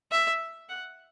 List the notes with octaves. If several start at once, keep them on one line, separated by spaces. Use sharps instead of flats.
E5
F#5